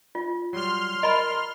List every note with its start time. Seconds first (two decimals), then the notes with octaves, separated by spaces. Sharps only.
0.15 F4
0.53 F#3 G3 C6 F6
1.03 A#4 D#5 B5